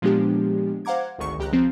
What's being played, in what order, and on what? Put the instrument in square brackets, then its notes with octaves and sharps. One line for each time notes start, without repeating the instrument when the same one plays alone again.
[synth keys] A#2 F3 G#3 B3 D4 G4
C5 F5 F#5 A#5 D6 G#6
G#1 D2 D#3 C#6
C#2 G4 A#5 F#6
F3 C4